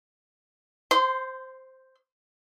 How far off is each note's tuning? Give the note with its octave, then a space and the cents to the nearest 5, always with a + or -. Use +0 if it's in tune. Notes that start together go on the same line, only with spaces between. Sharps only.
C5 +0 C6 -25